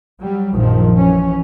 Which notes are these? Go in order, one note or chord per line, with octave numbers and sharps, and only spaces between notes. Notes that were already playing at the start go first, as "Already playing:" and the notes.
F#3 G3
A#1 F#2 D#3 F3
E3 C#4